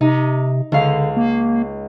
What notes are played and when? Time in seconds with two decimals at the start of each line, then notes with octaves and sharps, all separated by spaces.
0.01 C3 D#4
0.72 C#2 D3 F5 C7
1.17 A#3